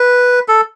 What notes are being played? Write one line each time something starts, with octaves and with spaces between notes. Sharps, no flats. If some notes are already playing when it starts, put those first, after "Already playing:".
Already playing: B4
A4